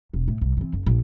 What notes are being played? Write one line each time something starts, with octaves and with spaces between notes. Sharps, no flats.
E1
A2
C2
E3 C4
F#1
A#1